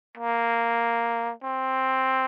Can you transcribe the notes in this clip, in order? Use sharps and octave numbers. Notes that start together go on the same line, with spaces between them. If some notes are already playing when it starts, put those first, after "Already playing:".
A#3
C4